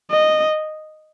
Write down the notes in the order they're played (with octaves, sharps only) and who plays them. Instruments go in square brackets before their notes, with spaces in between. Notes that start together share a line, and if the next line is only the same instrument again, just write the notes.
[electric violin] D#5